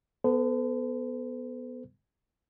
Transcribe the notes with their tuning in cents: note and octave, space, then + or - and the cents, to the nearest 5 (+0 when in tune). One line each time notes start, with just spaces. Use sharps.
B3 +0 A4 +0 C5 -45